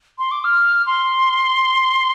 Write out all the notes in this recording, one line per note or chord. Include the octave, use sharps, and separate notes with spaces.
C6
D6
F6
C6